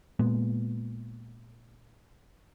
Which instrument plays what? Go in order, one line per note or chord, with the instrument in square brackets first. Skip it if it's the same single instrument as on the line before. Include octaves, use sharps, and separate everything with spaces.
[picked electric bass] A#2 G#3 B3